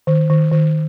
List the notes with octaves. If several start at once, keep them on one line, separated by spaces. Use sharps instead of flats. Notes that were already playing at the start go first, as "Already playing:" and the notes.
D#3
D#3
D#3